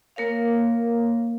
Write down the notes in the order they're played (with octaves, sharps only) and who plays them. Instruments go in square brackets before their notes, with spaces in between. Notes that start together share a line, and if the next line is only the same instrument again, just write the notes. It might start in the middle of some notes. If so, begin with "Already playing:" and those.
[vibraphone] A#3 A#4 C#5 F5